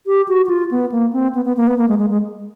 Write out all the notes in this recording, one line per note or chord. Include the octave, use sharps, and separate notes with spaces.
G4
F#4
F#4
F4
B3
A#3
C4
B3
B3
A#3
B3
A#3
G#3
G#3
G#3